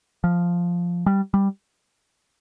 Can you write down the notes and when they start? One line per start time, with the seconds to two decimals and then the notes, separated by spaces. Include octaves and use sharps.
0.24 F3
1.06 G3
1.34 G3